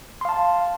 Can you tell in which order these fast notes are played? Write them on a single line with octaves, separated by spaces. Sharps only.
C6 F5 A5